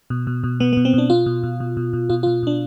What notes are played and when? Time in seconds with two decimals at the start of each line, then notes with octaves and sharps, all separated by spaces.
0.10 B2
0.27 B2
0.44 B2
0.60 B2 B3
0.73 B3
0.77 B2
0.85 C4
0.94 B2 D4
1.10 B2 F4
1.26 B2
1.43 B2
1.60 B2
1.77 B2
1.93 B2
2.10 B2 F4
2.23 F4
2.27 B2
2.43 B2 D4